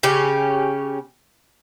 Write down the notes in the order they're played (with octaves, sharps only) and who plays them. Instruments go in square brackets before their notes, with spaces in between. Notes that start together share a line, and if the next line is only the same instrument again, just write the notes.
[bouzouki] C#3 C#4 G4